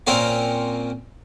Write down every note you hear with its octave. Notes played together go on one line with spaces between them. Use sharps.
A#2 C4 C#4 A#4 F5